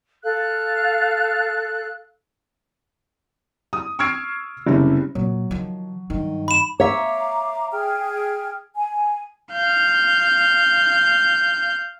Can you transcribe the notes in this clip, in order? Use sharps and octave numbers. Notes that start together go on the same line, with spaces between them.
A4 F5 F#6
D#6
C#6 E6 F6 G#6 C7 D7
F#1 C3 G3 C#4
A#2 F#3
D#3 F3
G2 D#3
B5 E7
C#5 E5 F5 A#5 D6
G#4 G5 F6
G#5
F5 G6